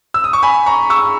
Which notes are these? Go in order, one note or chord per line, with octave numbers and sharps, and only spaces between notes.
E6
D#6
C#6
G#5 B5
A#5 C#6
C#6 E6